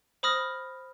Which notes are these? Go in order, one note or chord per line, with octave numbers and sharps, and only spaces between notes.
C5 B5 D#6 F6 A#6